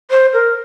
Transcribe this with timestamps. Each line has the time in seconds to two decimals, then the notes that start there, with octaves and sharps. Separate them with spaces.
0.10 C5
0.33 A#4